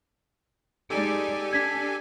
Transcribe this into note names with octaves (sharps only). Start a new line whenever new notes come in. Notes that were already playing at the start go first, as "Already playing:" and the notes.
G#3 D#4 G4 A4 D5 G#5
D4 G#6 B6